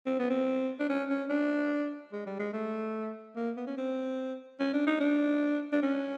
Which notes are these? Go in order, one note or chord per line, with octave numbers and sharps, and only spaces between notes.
C4
B3
C4
D4
C#4
C#4
D4
G#3
G3
G#3
A3
A#3
B3
C#4
C4
C#4
D4
D#4
D4
D4
C#4